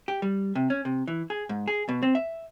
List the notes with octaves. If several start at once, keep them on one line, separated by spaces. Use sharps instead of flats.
G4
G3
C3
C#4
C3
E3
G#4
G#2
G#4
B2
C4
E5